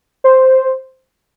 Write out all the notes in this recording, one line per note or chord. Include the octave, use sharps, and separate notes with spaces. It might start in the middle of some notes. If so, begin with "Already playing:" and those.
C5